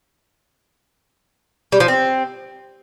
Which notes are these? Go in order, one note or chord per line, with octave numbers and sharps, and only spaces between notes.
G3
F3
C4